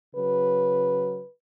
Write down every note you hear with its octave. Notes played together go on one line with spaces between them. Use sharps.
C#3 F#3 B4